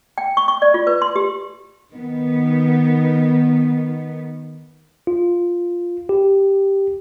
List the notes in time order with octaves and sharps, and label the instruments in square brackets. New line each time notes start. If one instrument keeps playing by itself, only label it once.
[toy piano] G5
C#6
C#6
D5
F4
B4
C6
G4
[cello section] D#3 B3
[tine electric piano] F4
G4